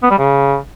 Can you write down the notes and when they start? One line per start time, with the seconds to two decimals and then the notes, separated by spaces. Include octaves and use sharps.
0.03 B3
0.10 G3
0.18 C#3